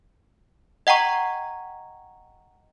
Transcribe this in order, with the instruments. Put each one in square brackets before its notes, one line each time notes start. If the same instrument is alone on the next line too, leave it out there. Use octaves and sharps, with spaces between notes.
[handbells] D#5 F#5 G5 A#5 C#6